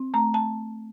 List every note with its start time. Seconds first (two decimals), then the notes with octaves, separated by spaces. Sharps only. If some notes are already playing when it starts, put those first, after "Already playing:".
Already playing: C4
0.14 A3 A#5
0.34 A5